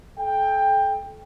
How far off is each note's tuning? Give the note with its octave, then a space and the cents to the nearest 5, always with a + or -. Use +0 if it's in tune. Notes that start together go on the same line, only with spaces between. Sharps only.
A4 -35 G5 +15